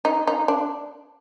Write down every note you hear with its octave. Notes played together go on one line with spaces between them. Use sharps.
D#4
D#4
D4